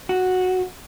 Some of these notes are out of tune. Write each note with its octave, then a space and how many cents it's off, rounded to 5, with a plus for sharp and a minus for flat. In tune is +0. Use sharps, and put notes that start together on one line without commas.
F#4 -5